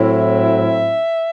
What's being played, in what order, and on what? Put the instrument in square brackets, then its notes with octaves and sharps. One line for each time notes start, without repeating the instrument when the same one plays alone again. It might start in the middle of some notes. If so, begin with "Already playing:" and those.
Already playing: [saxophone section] A2 F#3 C4 E4
E5